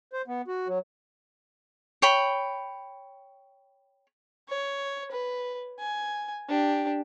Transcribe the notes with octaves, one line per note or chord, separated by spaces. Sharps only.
C5
B3
F#4
F#3
C#5 G5 B5
C#5
B4
G#5
D4 G4